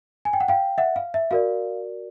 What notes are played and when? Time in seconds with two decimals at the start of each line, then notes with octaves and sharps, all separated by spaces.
0.25 G#5
0.33 G5
0.40 F#5
0.48 F5 G5
0.78 E5 F#5
0.96 F5
1.14 E5
1.31 F#4 A#4 D5 F5